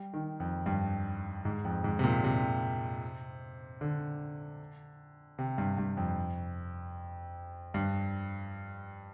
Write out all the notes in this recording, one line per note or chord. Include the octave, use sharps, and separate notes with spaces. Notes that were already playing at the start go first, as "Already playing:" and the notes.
Already playing: G3
D#3
F2
G2
G#2
F2
G#2
C3
A#2
C3
D3
C3
G2
G2
F2
G2